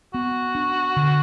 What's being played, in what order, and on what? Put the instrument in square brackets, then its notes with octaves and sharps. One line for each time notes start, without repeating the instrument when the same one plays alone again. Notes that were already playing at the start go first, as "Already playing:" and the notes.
[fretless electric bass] B3 [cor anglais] F#4
[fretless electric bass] D4
D3